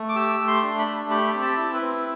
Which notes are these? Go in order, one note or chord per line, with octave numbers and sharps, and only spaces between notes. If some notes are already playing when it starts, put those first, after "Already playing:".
Already playing: A3
D6
G4 E6
A3
C6
D4
B5
A3
G4 B5
C4
A5
E4
B4
C4